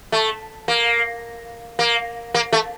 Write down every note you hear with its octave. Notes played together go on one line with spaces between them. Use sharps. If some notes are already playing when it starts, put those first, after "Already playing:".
A3
A#3
A#3
A#3
A3